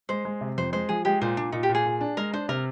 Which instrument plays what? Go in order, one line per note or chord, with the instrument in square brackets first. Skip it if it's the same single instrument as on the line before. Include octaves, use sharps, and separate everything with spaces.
[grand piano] G#3 [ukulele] C5
[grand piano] G#3
C3
[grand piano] F2 [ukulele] C5
[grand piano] G#3 [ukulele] C5
[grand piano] F3 [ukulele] G#4
[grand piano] G#3 [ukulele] G4
[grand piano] A#2 [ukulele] C5
[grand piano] A#2 [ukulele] D4
[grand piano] A#2 [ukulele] D#4
[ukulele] G4
[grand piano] A#2
[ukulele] G#4
[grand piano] A#2
D4
[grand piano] G#3 [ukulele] A#4
[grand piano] D4 [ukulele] C5
[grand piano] C3 [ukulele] A#4